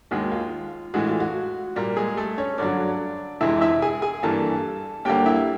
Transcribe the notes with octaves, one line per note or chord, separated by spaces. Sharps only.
D#2 D#3 G#3 F#4
F4
A2 E3 G#3 F#4
F4
F#4
A#2 G3 A#3
G#3 G#4
A3 A4
C#4 C#5
G2 D3 F#3 D4 D5
F2 C3 E3 G#3 E4 E5
D#5
E4 E5
G#4 G#5
G#4 G#5
G2 E3 G3 A#3 A4 A5
D#2 D3 G3 A#3 G4 G5
E4 E5